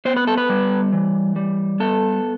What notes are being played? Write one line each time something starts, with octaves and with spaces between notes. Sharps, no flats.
B3 C5
B4
A4
B4
G3
E3
G3
B3 A4